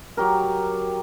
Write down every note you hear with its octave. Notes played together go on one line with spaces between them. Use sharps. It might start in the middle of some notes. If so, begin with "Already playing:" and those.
F#3 G4 A#4